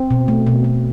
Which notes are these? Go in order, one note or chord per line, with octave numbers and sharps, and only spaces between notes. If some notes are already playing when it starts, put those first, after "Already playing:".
Already playing: C4
B2
A3
B2
B2